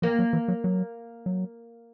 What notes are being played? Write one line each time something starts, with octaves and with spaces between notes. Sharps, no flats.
F3 A#3
F#3
E3
F#3
F#3
F#3